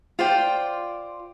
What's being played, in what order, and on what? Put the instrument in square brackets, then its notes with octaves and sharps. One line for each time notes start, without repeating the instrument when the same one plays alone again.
[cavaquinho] F4 C5 D5 G5